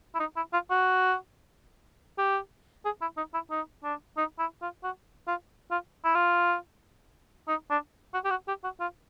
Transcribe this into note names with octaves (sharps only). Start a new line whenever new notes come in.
E4
D#4
E4
F4
F#4
G4
G#4
E4
D#4
E4
D#4
D4
D#4
E4
F4
F#4
F4
F4
E4
F4
D#4
D4
F#4
G4
F#4
G4
F#4
F4